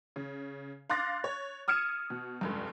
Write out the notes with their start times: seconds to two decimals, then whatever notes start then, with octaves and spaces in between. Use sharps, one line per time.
0.16 C#3
0.90 F5 C6 D6 F#6 A6 A#6
1.24 C#5
1.68 D#6 F6 G#6 C#7 D#7 E7
2.10 B2
2.41 F1 C#2 G2